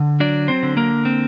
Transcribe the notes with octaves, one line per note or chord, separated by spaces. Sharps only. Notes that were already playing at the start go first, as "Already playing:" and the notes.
Already playing: D3
F#3 D4 D5
C4 C5
D3
A#3 A#4
C4